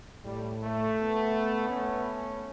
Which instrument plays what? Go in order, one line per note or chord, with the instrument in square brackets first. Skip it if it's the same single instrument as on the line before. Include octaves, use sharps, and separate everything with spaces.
[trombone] A2 [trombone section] G3
[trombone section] A3
[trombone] B3
[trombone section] A3 C#4